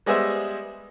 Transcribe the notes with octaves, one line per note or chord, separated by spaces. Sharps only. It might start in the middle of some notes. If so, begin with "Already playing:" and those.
G3 G#3 B3 G#4 C5 E5